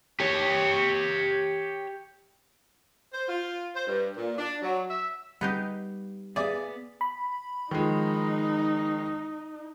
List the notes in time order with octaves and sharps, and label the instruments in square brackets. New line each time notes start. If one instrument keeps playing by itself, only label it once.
[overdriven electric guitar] G4 C#5
[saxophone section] C5
F4
C5
G2
A#2
D4
F#3
E5
[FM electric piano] G3 [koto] B3 D#4 G4
[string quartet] B3 [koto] G#4 [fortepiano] D5 E5 D6
[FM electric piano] B5
[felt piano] D#3 F3 G#3 [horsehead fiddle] D#4